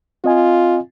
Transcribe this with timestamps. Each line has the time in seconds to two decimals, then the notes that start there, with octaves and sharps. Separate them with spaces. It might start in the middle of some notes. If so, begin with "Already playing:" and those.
0.24 C4 F4 D#5 G#5